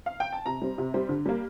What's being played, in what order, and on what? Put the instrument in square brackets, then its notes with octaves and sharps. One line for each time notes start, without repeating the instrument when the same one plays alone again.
[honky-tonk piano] F5
G5
A5
C3 A#5
G3 C4
C3
G3 C4
D3
G3 A#3